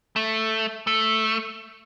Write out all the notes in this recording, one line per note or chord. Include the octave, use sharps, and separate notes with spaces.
A3
A3